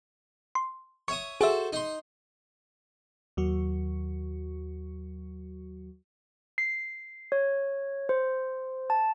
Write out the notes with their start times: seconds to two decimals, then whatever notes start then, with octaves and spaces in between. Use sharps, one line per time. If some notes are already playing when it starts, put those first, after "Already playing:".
0.55 C6
1.08 C#5 E5 C#6 D#6
1.41 F#4 G#4 A4 C5 E5
1.73 D#4 C6
3.37 D#2 F#3 F#4
6.58 C7
7.32 C#5
8.09 C5
8.90 A5